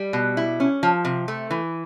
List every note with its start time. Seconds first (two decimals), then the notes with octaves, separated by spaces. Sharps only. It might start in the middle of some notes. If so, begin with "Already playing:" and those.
Already playing: G3
0.13 B2
0.37 E4
0.60 C#4
0.83 F3
1.05 C3
1.28 A3
1.51 E3